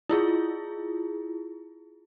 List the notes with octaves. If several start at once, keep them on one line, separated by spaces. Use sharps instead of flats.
E4 F4 G#4